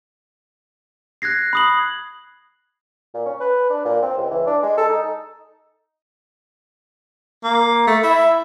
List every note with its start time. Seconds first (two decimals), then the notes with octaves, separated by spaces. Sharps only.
1.22 F#6 G#6 A#6 C7
1.53 B5 D#6 F#7
3.14 A#2
3.26 C#4
3.40 B4
3.70 D4
3.85 A#2
4.02 C4
4.17 C#2
4.31 E3
4.47 D4
4.63 G#3
4.77 A4
4.89 D#4
7.44 A#3
7.87 A3
8.04 E4